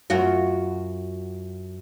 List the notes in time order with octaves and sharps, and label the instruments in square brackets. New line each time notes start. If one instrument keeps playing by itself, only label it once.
[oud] F#2 F4 F#4